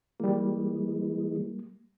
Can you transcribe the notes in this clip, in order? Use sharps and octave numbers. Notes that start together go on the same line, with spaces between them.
E3 G3 G#3 A#3